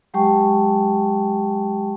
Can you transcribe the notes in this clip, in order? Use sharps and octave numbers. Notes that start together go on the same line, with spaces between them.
F#3 G#3 G4 G5 A5 C#6